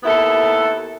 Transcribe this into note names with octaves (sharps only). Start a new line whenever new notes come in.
D#2 B3 E4 A4